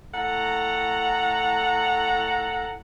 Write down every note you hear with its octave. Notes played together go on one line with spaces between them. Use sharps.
A2 A4 F#5 A#5